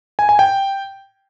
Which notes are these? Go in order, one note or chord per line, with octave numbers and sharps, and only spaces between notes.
G#5
G#5
G5